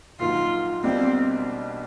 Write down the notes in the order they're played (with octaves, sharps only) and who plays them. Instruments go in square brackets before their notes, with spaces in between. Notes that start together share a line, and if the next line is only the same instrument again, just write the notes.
[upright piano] A#1 G#2 D#3 F#3 [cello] F4
[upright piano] B1 B2 G3 A#3 D4 [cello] C4